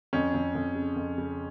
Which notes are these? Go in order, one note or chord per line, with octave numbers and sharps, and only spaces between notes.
F2 C#4
F2
F2
C#3
F2
C#3